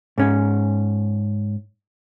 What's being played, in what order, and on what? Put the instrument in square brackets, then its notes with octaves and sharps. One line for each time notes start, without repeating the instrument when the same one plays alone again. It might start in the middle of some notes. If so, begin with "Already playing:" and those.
[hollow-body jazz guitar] G#2 C#4